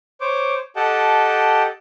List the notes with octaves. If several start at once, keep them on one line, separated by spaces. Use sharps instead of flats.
C5 C#5 D6
G4 A4 D#5 F#5 G5 A5